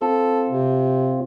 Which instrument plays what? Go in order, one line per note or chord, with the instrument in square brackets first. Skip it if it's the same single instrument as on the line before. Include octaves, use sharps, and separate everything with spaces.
[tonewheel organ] C4 F4 [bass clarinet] A4
[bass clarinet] C3